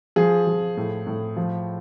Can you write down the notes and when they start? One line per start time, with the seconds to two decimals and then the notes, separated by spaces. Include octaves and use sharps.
0.16 F3 G#4
0.47 F3
0.77 A2
1.07 A2
1.36 F3